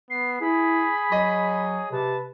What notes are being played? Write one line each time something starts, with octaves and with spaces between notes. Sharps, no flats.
B3 C7
E4 G#4 B5
F#3 D#5
C3 B4 A5